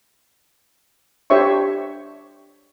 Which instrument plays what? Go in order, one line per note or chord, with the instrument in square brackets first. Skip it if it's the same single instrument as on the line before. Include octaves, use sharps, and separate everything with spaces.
[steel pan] D4 G4 C5 C#5 E5 C#6